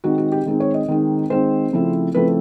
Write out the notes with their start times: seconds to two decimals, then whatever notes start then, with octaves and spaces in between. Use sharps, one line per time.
0.04 D#3 G#3 C4 D#4 F#4
0.18 F#4
0.32 G4
0.46 D#3 G#3 C4 D#4
0.60 C#5
0.74 D#5
0.88 D#3 G#3 C4 D#4
1.30 D#3 G#3 C4 D#4 C5
1.73 C#3 F3 A3 C4 E4
2.15 C#3 F3 A3 C4 E4 B4